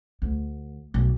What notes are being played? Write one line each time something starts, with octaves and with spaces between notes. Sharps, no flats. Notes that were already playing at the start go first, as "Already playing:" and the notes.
D2
B1